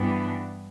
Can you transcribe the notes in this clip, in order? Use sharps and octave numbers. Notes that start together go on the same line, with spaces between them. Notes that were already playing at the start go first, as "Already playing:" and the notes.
Already playing: G2 E3 G3 B3 D4